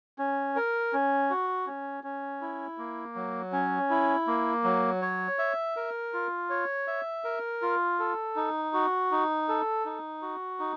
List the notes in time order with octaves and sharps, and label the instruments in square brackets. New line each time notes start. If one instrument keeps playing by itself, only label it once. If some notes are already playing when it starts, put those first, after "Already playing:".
[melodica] C#4
A#4
C#4
F#4
C#4
C#4
E4
A#3
F#3
C#4
E4
A#3
F#3
C#5
E5
A#4
F4
C#5
E5
A#4
F4
A4
D#4
F#4
D#4
A4
D#4
F#4
D#4